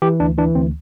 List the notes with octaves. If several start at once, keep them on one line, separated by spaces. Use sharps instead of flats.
E3 G4
D2 D4
E3 D4
D2 C4